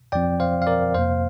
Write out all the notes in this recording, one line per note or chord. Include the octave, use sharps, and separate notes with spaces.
F2 F3 C4 D5 G5
C5 F5
F5
A#4 D5
F2 C3 A#3 C5 F5